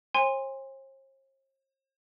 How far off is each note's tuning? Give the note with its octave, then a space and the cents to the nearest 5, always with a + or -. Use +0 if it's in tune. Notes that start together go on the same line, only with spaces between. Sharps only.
C5 +45 G#5 -35 C6 +0